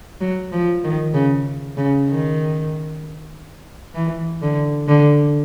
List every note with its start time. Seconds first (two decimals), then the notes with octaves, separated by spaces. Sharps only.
0.21 F#3
0.52 F3
0.84 D#3
1.14 C#3
1.77 C#3
2.09 D#3
3.95 E3
4.42 D3
4.88 D3